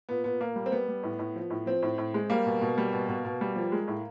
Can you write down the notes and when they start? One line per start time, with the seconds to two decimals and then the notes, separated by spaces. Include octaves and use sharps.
0.09 A#2 B3
0.24 A#2 B3
0.40 A#2 A#3
0.56 G3
0.66 C4
0.72 G3 B3
0.88 G3
1.03 A2
1.19 A2
1.36 F3
1.50 A2
1.66 F3 C4
1.82 A2
1.98 A2
2.14 G#3
2.30 G3 A#3
2.46 B2
2.61 B2
2.78 G3
2.93 B2
3.09 B2
3.25 B2
3.41 G3
3.56 F3
3.72 G#3
3.88 A2